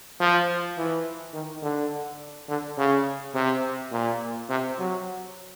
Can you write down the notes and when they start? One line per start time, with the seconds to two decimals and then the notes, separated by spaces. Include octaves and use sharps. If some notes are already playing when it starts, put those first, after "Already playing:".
0.20 F3
0.77 E3
1.34 D#3
1.62 D3
2.49 D3
2.78 C#3
3.34 C3
3.92 A#2
4.49 C3
4.79 F#3